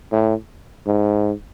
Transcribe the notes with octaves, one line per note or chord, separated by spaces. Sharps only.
A2
G#2